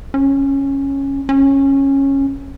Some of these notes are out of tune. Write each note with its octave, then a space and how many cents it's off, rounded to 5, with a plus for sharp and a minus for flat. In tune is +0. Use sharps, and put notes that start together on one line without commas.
C#4 -10
C#4 -15